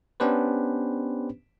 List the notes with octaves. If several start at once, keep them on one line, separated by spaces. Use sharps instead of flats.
B3 C#4 D4 G4 B4 C5